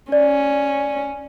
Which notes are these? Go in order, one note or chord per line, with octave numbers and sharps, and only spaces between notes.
C#4 D5